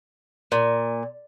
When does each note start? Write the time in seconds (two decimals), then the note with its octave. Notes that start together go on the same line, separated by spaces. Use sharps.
0.52 A#2